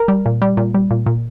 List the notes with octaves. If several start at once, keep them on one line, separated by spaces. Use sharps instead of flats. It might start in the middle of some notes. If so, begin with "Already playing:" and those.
Already playing: A#4 A#5
G3
A#2
G3
A#2
G3
A#2
A#2